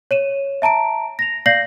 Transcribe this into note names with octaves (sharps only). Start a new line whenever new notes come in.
C#5 D#7 E7
E5 A5 A#5 D7
A#6 F7
D5 F5 G6 A#6 C7 F#7